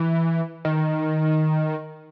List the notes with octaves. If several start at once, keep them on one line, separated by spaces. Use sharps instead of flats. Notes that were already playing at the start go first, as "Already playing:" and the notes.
Already playing: E3
D#3